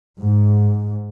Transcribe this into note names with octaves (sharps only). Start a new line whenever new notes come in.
G#2